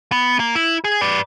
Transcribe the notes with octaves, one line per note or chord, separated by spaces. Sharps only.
B3
A#3
E4
G#4
B4 D5